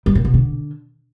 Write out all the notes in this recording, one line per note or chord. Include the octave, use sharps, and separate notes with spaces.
G3
A#2
B2
D3